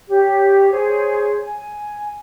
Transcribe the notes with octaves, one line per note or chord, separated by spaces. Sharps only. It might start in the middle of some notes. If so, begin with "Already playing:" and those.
G4 C#5
G#4 C5 C#5
G#5